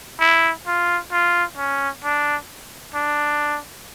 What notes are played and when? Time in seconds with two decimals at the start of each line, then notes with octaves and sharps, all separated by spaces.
0.20 E4
0.67 F4
1.12 F4
1.57 C#4
2.04 D4
2.94 D4